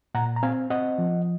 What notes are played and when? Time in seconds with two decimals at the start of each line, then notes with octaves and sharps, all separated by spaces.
0.15 A#2 F#5 A#5
0.36 A#5
0.43 C4 F5 G#5
0.70 C4 D#5 F#5
0.98 F3